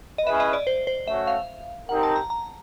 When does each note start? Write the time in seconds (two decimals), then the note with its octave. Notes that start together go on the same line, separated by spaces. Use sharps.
0.18 D#5
0.26 C#4 E4 G#4 B4 E5
0.40 D#5
0.53 D5
0.67 C5
0.87 C5
1.07 A3 C#4 F#4 E5
1.27 F5
1.89 C4 D#4 G4 A#4 F#5
2.03 A5
2.16 A#5
2.30 A#5